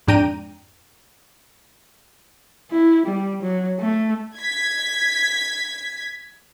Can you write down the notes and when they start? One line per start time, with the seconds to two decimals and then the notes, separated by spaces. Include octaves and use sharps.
0.07 F2 G#2 D4 G5 A#5 D#7
2.71 E4
3.07 G3
3.43 F#3
3.79 A3
4.37 G#6 B6